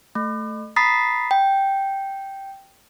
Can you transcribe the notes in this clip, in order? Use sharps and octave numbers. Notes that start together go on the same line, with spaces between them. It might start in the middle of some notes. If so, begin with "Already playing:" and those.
A3
A#5 B5 D#6 A6 B6 C7
G5